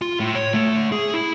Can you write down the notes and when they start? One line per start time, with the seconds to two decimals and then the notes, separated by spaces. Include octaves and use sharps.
0.02 F4
0.20 A2
0.35 C#5
0.54 D3 A3
0.92 G#4
1.14 E4